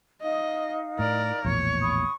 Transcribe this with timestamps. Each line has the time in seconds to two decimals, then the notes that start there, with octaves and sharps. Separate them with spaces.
0.22 D#4 D#5 F5
0.99 A2 A#4 D5
1.45 A#1 E2 A2 C#5
1.81 B5 C#6 D#6